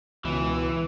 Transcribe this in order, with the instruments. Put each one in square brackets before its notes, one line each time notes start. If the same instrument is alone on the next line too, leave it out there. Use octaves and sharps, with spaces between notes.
[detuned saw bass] C#2 [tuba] B2 [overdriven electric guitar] E3